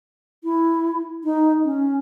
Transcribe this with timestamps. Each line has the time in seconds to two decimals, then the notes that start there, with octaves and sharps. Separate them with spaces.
0.44 E4
1.24 D#4
1.65 C#4